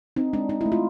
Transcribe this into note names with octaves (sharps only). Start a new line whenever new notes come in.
C4 D#4
G#3 D4
D4 D#4
A3 E4
F4